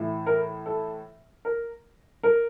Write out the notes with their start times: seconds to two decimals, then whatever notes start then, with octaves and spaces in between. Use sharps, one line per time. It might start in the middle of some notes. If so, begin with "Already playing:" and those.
Already playing: A2 E3
0.26 A#4
0.66 A4
1.45 A#4
2.23 A#4